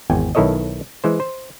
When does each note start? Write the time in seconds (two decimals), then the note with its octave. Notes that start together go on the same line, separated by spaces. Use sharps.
0.10 G#1 E2 G5 G#5
0.35 B1 D#3 E4 A4 C#5 D#5
1.04 E3 G#3 C5
1.20 C5